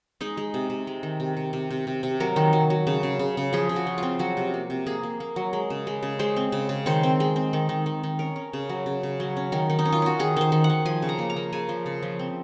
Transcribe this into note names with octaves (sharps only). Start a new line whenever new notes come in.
G#3 D#4
G#3
C3
C3
G#3
D#3
C3
C3
C3
C3
C3
C3
F#3 A#4
D#3
F#3
F#3
C#3
C#3
C#3
C#3
F3 G#4
C#3
F#4
F3
C4 F4
F#3 F#4
C3
A#3
C3
A#3 G#4
A#3
A#3
F#3
G#3
C#3
G#3
C#3
G#3 C5
C4
C#3
C#3
D#3 C5
C4
G#3
C4
D#3
D#3
D#3
D#3
C#4 A#4
C#4
C#3
F#3
C#3
C#3
F#3
C#4
D#3 A#4
D#3
D#4
C#4
F4
C#4 F#4
D#3 G#4
D#3 C5
D#3
F#5
D#3
F3 G#5
C#3
A#5
A#3
A#5
A#3
C#3 G#5
F3
C#3
F3
C4